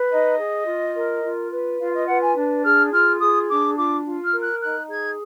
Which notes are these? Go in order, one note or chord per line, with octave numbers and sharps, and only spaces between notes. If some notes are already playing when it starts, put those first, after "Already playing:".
Already playing: B4
D#4 D#5
G#4
F4
A#4
F4
B4
F4 F5
D#5
B4 F#5
G#5
D4
G#4 F6
F4 F6
G#4 D#6
D4 D6
F4 D6
F4
F6
A#4
F#6
D#4 F#6
G#4 G#6